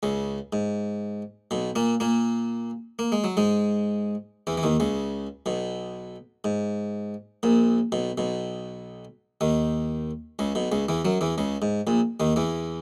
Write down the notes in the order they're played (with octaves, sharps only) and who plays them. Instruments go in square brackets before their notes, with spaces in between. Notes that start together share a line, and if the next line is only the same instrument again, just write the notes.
[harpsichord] C#2 C#3
G#2
B1 B2
A#2 A#3
A#2 A#3
A#3
G#3
F#3
G#2 G#3
E2 E3
E3
D#2 D#3
C#2 C#3
B1 B2
G#2
A#1 A#2
B1 B2
B1 B2
D#2 D#3
C#2 C#3
B1 B2
C#2 C#3
E2 E3
F#2 F#3
E2 E3
C#2 C#3
G#2
A#1 A#2
D#2 D#3
E2 E3